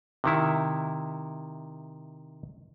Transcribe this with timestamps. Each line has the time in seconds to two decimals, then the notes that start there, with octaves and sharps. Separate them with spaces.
0.24 C3 D#3 E4